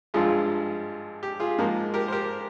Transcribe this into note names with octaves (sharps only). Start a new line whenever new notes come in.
G#1 G2 F3 G#3 F4 G#4
G4
F4 G#4
G#2 F3 A#3
G4 A#4
C5
G4 A#4